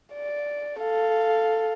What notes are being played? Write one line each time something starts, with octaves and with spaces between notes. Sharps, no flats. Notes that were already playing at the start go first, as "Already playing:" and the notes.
D5
A4 F5